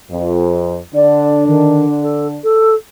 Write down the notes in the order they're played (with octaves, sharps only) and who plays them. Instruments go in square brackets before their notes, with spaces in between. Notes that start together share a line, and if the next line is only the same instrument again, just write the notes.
[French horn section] F2
[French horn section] D3 D4 [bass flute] D5
[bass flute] D#3
A4
A4